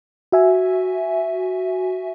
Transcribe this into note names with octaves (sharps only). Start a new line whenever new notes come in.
F#4 E5 G#5